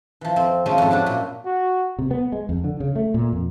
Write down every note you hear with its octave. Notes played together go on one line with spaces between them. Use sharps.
E3 F3
F2 C4
F3 G#3 A3 C4 C#4
F2 G#2
F#3 D4 E4 F#4
F#2 A#2
F#4
C3
B3
G#3
F2
D3
C#3
A3
A#2
F2